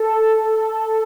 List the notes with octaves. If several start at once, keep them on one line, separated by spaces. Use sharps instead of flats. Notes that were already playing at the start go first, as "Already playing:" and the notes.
Already playing: A4